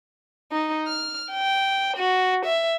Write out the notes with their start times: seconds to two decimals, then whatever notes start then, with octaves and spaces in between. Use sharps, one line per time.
0.52 D#4
0.87 F6
1.31 G5
1.97 F#4
2.46 E5